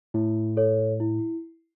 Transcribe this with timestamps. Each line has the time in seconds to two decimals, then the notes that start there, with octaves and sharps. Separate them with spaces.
0.14 A2 E4
0.57 A4 C#5
1.00 E4